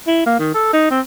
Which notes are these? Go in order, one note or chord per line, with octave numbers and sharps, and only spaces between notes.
E4
A#3
D#3
A4
D#4
C4